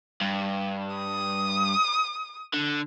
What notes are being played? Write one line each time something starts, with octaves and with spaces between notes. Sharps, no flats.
G2
D#6
D3